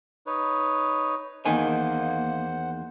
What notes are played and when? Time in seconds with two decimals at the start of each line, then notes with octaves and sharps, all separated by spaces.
0.27 D#4 B4 C#5
1.45 E2 D#3 A#3 C5 F#5 G#5